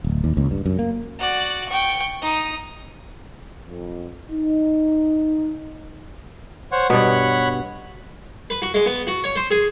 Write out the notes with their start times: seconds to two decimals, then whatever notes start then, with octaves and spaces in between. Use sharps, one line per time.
0.04 D1
0.24 D#2
0.37 C#2
0.51 G2
0.66 F#2
0.79 A#3
1.19 F#4 D5
1.69 G5 C#6
2.22 D#4 D#6
3.68 F2
4.32 D#4
6.72 C5 C#5 F#5
6.90 G2 B2 C#5 F#5 B5
8.50 B4
8.62 F#4
8.74 G#3
8.86 B3
9.07 F#4
9.24 C#5
9.36 C5
9.51 G#4